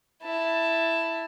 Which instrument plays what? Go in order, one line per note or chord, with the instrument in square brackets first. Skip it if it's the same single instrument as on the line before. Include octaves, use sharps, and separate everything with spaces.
[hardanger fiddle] E4 A5